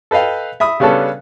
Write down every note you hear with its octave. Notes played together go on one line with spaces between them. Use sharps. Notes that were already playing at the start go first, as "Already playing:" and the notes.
A4 B4 D#5 F5 G5
E5 B5 D#6
C#3 G3 B3 C#4 D4 A4